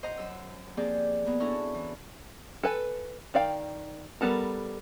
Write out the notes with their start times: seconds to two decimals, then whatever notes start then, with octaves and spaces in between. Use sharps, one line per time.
0.03 C5 D#5 F#5 A#5
0.17 F#2 E6
0.77 F3 A#3 C4 G4 G#4 D5
1.26 A#3 B3 G#4
1.40 C#4 D4 E4 F#4 A4 A#5
1.74 E3
2.63 A4 B4 G#5
3.34 D#3 D5 F5 G5
4.21 G3 B3 A4 A#4